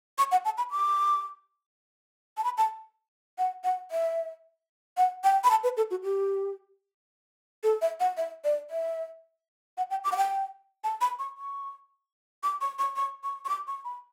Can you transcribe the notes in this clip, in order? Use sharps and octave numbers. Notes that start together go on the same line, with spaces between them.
C#6
F#5
A5
B5
D6
A5
B5
A5
F#5
F#5
E5
F#5
G5
B5
A5
B4
A4
F#4
G4
A4
E5
F#5
E5
D5
E5
F#5
G5
D6
F#5
G5
A5
B5
C#6
C#6
D6
C#6
C#6
C#6
C#6
C#6
D6
C#6
B5